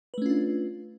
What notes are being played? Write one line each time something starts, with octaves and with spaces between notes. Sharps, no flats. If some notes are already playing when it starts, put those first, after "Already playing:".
A3 C#4 D4 F4 B4